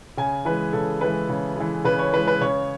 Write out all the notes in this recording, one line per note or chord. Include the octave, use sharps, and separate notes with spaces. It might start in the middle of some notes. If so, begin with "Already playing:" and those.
C#3 G#5
E3 G#3 B4
C#3 A4
E3 G#3 B4
C#3
E3 G#3
C#3 B4
C#5
E3 G#3 B4
B4
C#3 C#5